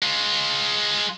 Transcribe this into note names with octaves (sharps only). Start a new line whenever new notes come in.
G#3 F4